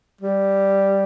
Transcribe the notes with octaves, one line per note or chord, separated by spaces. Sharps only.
G3